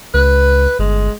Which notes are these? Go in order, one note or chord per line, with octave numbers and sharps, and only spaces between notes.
C#2 B4
G1 G#3